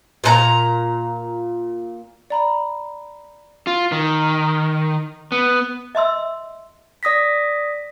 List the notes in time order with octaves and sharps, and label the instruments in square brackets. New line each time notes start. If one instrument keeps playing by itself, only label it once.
[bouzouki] A#2 F#4 A#5
[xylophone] D5 A#5 B5
[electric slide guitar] F4
D#3
B3
[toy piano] D#5 E5 C6 E6
[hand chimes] D5 D#6 A#6 B6